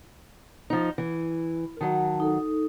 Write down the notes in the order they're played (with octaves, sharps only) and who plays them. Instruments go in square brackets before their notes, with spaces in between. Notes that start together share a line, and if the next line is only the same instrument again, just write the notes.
[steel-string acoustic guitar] F3 D#4
E3
[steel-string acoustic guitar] D#3 F#3 [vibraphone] A5
[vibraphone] D#4 A4